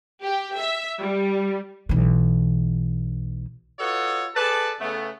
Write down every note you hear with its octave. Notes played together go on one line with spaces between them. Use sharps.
G4
E5
G3
B1 E3
F4 F#4 A4 B4 C#5 D#5
G#4 A4 B4 D5 A5
C#3 A3 B3